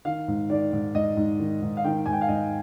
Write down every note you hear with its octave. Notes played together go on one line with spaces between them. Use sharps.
D#3 F5
G#2
D#3 D5
G#2
G#2 D#5
G#2
D#3
G#2
F5
D#3 G5
G#2 G#5
G5
F5
G#2 D#5